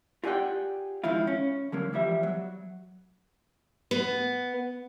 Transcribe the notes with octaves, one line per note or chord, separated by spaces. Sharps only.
F4 G4 G#4 D5 F#5 G5
G#2 D#3 F3 E4 F4
C#4
D3 F#3 A#3
E2 F3 G3 E5
F#3
B3